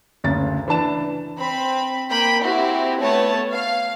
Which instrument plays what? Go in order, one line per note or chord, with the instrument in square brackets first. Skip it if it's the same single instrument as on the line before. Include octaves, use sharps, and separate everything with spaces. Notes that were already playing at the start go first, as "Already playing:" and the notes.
[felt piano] F#1 D2 C#3 A6
E3 D4 A5 E7
[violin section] C4 B5
A#3 G5 B5
C4 E4 F#4 G4
A3 B3 C#5 A5
F5